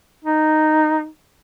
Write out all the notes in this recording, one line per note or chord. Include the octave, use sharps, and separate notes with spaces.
D#4